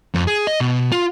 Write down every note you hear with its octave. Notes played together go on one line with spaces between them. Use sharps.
F2
G#4
D#5
B2
F4